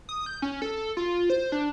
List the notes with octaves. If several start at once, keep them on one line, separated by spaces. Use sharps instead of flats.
D#6
G6
C#4
A4
F4
C5
D4